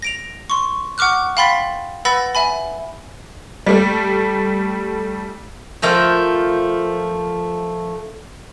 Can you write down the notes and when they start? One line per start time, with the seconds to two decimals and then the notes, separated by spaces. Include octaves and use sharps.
0.02 A#6 D7 F7
0.50 C6 C#6
0.98 F#5 C#6 D6 F6 F#6
1.37 F5 G5 B5 C6 A6 B6
2.05 B4 F#5 B5 E6 A6 A#6
2.35 E5 G#5 B5
3.66 G3 A3
5.82 F3 A3 A#4 G5